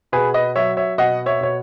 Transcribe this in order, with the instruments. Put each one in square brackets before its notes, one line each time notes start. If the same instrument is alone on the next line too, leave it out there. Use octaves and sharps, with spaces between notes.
[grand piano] B2 G#4 B4
B4 D#5
F#3 C#5 E5
C#5 E5
B2 D#5 F#5
C#5 E5
B2 C#5